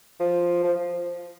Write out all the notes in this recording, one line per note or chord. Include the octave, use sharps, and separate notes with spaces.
F3
F3